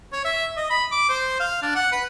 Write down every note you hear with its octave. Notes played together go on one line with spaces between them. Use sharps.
C#5
E5
D#5
B5
D6
C5
F5
D4
F#5
B4